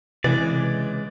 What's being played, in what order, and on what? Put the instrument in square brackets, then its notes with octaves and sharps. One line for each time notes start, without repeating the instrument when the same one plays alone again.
[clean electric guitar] C#2 G#3 D5 [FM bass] C3 [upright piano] E3